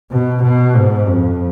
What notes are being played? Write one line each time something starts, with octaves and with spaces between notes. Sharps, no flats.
B2
B2
G#2
F2